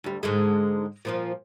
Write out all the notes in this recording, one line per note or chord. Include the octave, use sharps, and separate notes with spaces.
D2 G3
G#2 D3 G#3
A#2 F3 F4